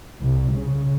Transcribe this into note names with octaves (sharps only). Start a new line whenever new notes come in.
C2
C#3